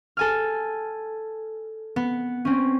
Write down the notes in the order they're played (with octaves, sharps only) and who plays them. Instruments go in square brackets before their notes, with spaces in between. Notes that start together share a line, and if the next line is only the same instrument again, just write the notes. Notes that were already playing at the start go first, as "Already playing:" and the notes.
[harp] A4 G#5 F6
B3
C4 C#4